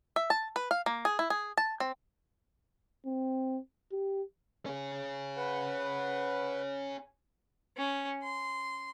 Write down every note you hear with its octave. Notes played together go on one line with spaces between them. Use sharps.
E5
A5
B4
F5
A#3
G#4
E4
G#4
A5
C4
C4
G4
C#4 G#4
B4 F#5
C#4
C6